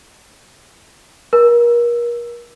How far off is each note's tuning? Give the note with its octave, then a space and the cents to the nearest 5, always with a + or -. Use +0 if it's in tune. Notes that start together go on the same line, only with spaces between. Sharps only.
A#4 +35